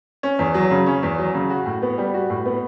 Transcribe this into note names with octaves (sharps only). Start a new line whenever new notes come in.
C#4
E2
F#3
C#3
C#4
E2
F#3
C#3
F#4
A2
B3
G3
F#4
A2
B3